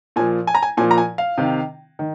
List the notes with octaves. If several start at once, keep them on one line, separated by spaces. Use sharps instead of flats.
A#2 F3 G#5
G#5
A#5
G#5
A#2 F3 G#5
A#5
G#5
F5
C3 D#3
D#3